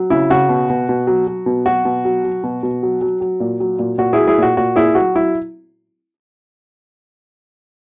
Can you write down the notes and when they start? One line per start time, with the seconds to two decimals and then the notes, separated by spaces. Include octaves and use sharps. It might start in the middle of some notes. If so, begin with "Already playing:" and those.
Already playing: F#3
0.10 C#3 E4
0.30 C#3 F#4
0.49 B2
0.70 B2
0.89 B2
1.07 F#3
1.27 F#3
1.46 B2
1.66 F#3 F#4
1.85 B2
2.05 F#3
2.24 F#3
2.43 B2
2.63 B2
2.83 F#3
3.01 F#3
3.21 F#3
3.40 A#2
3.60 F#3
3.79 A#2
3.98 A#2 F#4
4.13 E4 G#4
4.18 F#3
4.27 E4 G#4
4.38 A#2 F#4
4.57 A#2 F#4
4.76 A#2 E4 G#4
4.95 F#3 F#4
5.15 F#3 E4